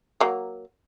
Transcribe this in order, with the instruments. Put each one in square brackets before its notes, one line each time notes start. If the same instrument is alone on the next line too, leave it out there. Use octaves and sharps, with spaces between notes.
[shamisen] F#3 A#3